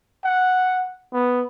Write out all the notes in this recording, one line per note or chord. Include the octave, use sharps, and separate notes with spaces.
F#5
B3